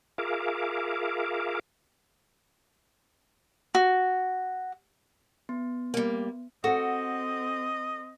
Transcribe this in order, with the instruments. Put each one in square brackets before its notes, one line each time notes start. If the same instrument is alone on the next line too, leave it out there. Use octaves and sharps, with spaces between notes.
[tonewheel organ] F4 G#4 A#4 E5 F5 D6
[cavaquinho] F#4
[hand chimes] B3
[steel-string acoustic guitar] G3 A#3
[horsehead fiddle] C4 [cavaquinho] F#4 [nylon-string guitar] A4 F#5 [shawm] D#5